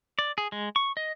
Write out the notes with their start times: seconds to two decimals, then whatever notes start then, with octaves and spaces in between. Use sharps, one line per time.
0.19 D5
0.38 G#4
0.52 G#3
0.76 C#6
0.97 D#5